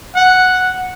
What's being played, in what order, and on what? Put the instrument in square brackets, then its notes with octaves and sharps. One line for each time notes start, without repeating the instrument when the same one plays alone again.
[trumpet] F#5